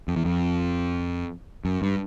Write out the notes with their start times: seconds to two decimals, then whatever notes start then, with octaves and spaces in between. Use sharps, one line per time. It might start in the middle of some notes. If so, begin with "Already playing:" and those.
0.08 F2
0.16 E2
0.25 F2
1.65 F#2
1.82 G2